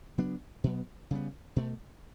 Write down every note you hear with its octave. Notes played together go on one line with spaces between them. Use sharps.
C#3 F#3 B3 D4
B2 F#3 B3
C#3 G3 B3
B2 A3